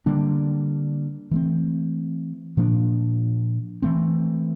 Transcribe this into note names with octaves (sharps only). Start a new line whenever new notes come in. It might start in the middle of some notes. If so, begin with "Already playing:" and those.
D3 G3 A#3 D4
E3 A3 C4
A#2 F3 A#3 D4
E3 A3 C4